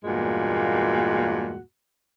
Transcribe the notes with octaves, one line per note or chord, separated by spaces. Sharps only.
E2 G2 A#2 G#3 A#3 F#4